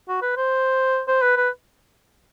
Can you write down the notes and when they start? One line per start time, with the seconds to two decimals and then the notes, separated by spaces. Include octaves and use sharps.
0.09 F#4
0.22 B4
0.37 C5
1.08 C5
1.22 B4
1.37 B4